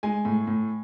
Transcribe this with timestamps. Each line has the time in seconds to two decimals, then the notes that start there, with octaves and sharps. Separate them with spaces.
0.03 G#3 G#5
0.25 A2
0.47 A2